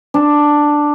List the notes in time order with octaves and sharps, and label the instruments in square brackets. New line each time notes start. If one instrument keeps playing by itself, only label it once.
[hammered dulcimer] D4